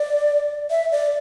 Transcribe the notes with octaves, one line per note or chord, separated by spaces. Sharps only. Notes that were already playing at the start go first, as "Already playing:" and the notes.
Already playing: D5
E5
D5